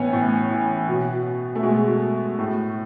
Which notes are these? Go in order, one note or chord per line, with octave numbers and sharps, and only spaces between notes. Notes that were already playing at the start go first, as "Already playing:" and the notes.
Already playing: A2 E3 B3 C#4
A2
E3
B2
A3
B2 G#3
A2